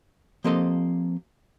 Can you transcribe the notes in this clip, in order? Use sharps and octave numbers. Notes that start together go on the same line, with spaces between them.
F3 A#3 C4 G4 A4 D#5